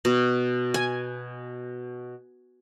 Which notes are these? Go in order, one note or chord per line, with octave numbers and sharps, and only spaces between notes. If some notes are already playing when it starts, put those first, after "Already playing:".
B2
G#5